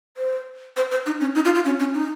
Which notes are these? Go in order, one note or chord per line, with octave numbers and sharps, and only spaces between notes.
C5
C5
C5
D#4
C#4
D#4
F4
F4
C#4
C#4
D#4